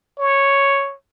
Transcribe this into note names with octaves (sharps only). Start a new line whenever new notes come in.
C#5